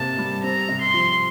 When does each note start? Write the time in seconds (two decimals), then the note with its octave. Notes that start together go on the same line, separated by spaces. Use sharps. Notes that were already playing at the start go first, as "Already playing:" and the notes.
Already playing: C3 A#3 A5
0.18 G3
0.43 C4 A#5
0.69 C3
0.81 C6
0.94 F3